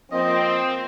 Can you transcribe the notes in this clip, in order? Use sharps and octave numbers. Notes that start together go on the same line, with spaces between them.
F3 A#3 C4 D#5